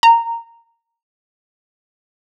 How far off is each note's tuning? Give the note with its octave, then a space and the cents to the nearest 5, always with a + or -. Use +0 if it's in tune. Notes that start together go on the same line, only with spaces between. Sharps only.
A#5 -15